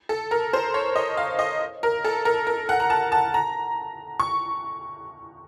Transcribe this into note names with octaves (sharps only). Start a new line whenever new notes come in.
A4
A#4
C5
C#5
D#5
F5
D#5
A#4
A4
A#4
A#4
F#5
A#5
A5
A5
A#5
C#6